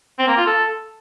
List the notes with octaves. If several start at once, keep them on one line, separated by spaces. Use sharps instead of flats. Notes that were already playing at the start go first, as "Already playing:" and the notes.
C4
A#3
F4
A4